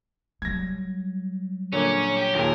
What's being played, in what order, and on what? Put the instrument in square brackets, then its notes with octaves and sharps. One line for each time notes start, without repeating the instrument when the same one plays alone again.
[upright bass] F#3 G3 [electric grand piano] G#6 A#6
[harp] A#2 C#5 D6 [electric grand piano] D3 [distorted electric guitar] C#4
[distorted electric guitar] G4
[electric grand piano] D#2 A#2 [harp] F4 G#4 [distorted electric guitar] A#4